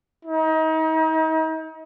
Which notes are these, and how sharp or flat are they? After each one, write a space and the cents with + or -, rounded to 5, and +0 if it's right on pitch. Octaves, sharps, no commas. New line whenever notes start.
D#4 +35